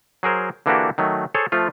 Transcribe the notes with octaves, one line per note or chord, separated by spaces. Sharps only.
F#3 G#4 A#4 C5
D3 E3 A#3 D4 F#4 G4
D#3 F#3 A3
G#4 A4 C5 C#5
F3 A3 F4